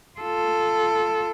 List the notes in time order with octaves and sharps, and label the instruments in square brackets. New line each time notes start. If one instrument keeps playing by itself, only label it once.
[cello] F4 A4